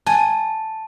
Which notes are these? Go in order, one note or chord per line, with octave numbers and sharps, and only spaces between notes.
G#5 A5